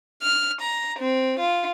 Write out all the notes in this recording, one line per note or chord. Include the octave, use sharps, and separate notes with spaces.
F6
A#5
C4
F4